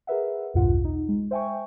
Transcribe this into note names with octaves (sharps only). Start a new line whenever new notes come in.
G#4 A#4 B4 E5 F#5
B1 E2 G2 B2 F4 F#5
D#4
G#3
C5 E5 G5 G#5 C#6